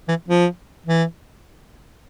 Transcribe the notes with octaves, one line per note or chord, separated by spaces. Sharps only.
E3
F3
E3